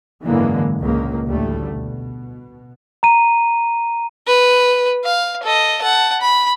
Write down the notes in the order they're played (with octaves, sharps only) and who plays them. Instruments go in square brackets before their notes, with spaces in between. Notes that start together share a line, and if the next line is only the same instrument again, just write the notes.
[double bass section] G#1 F#2 D3 E3 G#3 A#3
C#2 A#2 A#3
A1 D2 G3 A3
B2
[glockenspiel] A#5 D#7
[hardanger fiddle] B4
F5
A4 D#5
F#5 A5
B5